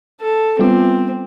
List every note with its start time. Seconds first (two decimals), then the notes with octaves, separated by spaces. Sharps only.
0.21 A4
0.59 G3 B3 C4 F4